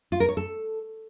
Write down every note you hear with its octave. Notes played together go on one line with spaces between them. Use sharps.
F4
A#4
C#5
A4